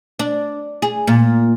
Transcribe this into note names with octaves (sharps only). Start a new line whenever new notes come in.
D4
G#4
A#2